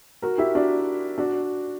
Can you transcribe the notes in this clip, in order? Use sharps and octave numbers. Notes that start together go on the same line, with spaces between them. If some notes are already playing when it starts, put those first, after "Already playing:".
F#4 A#4
E4 G4
D4 F#4
D4 F#4